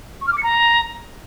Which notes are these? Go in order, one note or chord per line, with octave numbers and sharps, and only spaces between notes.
C#6
F6
D6
C#7
A#5